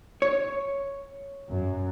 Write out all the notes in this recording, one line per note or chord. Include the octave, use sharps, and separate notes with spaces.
C#5
F#2